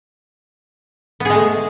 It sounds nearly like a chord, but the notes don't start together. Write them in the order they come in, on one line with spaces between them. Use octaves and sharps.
B3 G#4 G#3 A3